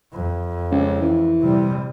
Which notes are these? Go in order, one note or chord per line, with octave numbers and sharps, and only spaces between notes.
F2
C#2
E3
C3 G3